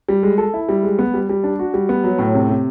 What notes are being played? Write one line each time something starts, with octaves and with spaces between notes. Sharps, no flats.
G3
G#3
A4
E4
G3
G#3
B3
G3
G3
D4
F#4
G3
B3
F#3
A2
C3
C3